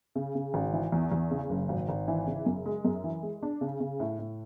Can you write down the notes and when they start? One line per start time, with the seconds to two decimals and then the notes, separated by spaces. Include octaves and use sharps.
0.15 C#3
0.35 C#3
0.54 G#1
0.73 E3
0.92 E2
1.12 E2
1.31 C#3
1.50 F#1
1.69 G#1
1.89 G#1
2.08 E3
2.27 C#3
2.46 F#2
2.66 G#3
2.85 F#2
3.04 E3
3.23 G#3
3.43 D4
3.61 C#3
3.80 C#3
4.00 A2
4.19 A2